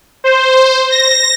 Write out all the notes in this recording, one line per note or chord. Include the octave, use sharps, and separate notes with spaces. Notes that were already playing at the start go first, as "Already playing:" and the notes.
C5
A#6